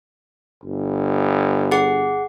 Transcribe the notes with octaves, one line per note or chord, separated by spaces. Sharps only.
G1
G#4 F#5